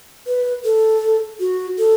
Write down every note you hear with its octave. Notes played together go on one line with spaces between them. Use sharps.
B4
A4
F#4
A4